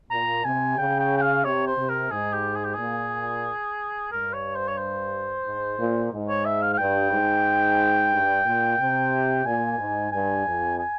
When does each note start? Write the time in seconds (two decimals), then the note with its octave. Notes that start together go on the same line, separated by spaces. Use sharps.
0.10 A#2 A#5
0.45 C3 G#5
0.77 C#3 G5
1.00 G5
1.18 G5
1.22 F5
1.44 C3 C#5
1.67 C5
1.77 C3
1.89 A#4
2.11 G#2 G#4
2.33 G4
2.56 G#4
2.65 G4
2.74 A#2 G#4
4.12 G2 A#4
4.33 C#5
4.56 C5
4.68 C#5
4.78 C5
5.45 G#2
5.78 A#2
6.12 G#2
6.28 C#5
6.45 E5
6.62 F5
6.73 F5
6.78 G2 G5
7.12 G#2
8.12 G2
8.45 A#2
8.79 C3
9.45 A#2 G#5
9.78 G#2
10.12 G2 G#5
10.46 F2
10.79 G#5